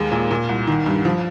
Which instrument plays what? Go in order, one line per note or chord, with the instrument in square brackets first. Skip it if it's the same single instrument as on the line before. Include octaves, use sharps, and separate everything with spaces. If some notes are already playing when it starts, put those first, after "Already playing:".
Already playing: [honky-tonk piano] D#2 G#3
A#2
A#2
C2
D#3
G2
F3